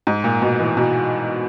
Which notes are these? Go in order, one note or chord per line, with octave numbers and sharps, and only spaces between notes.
G#2
A#2
B2
E3
B2